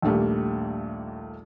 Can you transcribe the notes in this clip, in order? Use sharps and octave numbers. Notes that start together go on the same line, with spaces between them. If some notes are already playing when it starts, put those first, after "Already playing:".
A#1 D#2 G3 A3 A#3